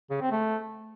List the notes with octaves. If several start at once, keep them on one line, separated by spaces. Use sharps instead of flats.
C#3
C4
A3